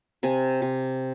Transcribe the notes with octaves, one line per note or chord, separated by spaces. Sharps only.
C3 G#5
C3